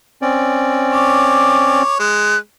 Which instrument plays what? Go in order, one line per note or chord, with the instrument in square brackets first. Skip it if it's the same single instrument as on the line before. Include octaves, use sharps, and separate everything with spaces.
[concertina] C4 C#4 D5
[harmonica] C#5 [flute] D6
[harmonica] G#3 [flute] F#6